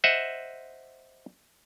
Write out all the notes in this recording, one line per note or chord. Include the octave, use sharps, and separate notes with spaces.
C5 D#5 E5 F#5